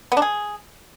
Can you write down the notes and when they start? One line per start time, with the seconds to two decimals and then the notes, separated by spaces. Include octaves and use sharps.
0.12 B3
0.17 D4
0.22 G#4